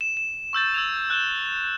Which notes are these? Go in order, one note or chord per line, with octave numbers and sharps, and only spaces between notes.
E7
E7
C#6 E6 G6 A6
E6 G#6 F7
F#6 G6 E7 G7